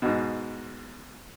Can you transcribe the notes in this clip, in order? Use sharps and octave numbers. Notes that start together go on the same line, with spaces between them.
G#2 B2